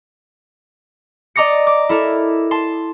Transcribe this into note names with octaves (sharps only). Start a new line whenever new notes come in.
D5 D#5 A#5 D6 A#6 C#7
D6
E4 A4 A#4
A5 C6